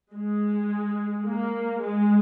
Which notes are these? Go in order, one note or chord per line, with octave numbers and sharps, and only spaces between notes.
G#3
A#3
G#3